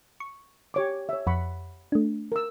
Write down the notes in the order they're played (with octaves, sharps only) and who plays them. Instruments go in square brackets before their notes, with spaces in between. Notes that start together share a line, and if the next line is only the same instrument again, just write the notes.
[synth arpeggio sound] C#6
[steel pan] G4 C#5 D6
C#5 E5
[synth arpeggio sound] F2 [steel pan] F#5 B5 C#6
[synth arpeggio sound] A3 D4
[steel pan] A#4 E6